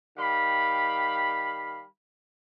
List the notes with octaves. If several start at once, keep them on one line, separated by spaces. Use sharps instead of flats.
D#3 G3 F5 B5